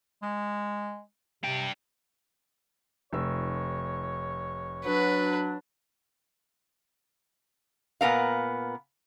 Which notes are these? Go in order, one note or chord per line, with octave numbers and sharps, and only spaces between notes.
G#3
C3 D4 G5
F1 C#5 E6
F#3 D4 B4
A#2 B3 A#4 F5